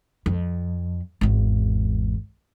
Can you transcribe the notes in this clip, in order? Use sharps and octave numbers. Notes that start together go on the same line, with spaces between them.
F2
G#1 E2